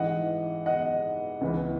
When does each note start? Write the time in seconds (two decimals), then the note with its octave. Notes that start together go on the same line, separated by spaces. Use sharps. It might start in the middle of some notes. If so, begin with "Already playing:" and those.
Already playing: A1 G#2 E3 D#5 F#5
0.66 D#5 F#5
1.41 C#2 C#3 E3 B3